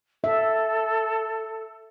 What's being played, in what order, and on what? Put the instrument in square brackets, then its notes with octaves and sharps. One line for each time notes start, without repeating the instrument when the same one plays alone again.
[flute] A4 [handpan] E5